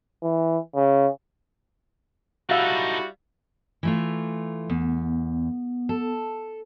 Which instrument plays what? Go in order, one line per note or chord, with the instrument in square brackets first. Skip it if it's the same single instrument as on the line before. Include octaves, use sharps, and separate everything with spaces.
[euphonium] E3
C#3
[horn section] G3 E4 F#4 [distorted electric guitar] D#4 A4 [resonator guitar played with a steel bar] E5 F5
[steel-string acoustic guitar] E3 A3 F4
[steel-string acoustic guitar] E2 [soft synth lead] B3
[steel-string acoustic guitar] A4